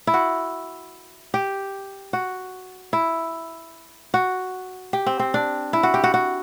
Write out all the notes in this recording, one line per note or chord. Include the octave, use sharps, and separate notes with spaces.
E4
F#4
G4
F#4
E4
F#4
G4
C4
C4
D4
E4
F#4
G4
F#4
F#4